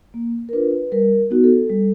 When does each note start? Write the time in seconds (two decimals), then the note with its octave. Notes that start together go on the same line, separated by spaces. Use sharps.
0.14 A#3
0.49 A#4
0.53 D4 F4 B4
0.92 G3 A#4
1.30 B3 D#4 F#4
1.44 A4
1.70 G3